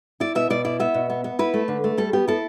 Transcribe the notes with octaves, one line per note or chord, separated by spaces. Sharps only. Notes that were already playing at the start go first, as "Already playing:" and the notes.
E4 D5
B2 E5
B2 D5
E4 D5
B3 E5
B2
B3
B3
E4 B4
A3
D3
A3
G3 A4
B3 G4
E4 A4